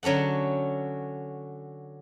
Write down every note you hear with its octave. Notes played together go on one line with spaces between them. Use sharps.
D3 F#3 C#4 A4 F#5